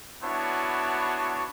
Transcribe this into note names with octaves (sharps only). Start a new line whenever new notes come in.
B3 D4 E4 F#4 C#5 A5